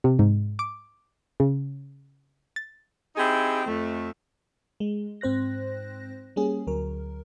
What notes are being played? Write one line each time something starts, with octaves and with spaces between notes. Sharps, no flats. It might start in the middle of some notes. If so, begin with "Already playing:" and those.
C3
G#2
D6
C#3
A6
C4 D#4 E4 G4 G#4
F2 A3
G#3
G#2 C4 C5 F#6 A#6
G3 A#3 C#4 G#4
D2 F#3 A#4